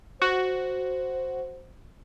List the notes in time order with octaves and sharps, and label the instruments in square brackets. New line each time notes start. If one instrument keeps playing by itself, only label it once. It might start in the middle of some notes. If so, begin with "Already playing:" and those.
[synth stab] F#4 [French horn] C5